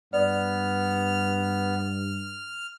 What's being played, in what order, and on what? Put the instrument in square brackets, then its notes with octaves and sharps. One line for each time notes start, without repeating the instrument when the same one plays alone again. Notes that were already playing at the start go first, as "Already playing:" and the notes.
[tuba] G2 [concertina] B3 [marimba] D5 [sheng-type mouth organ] F6